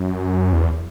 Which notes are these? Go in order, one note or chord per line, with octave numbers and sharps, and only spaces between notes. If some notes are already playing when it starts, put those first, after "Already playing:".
Already playing: F#2
E2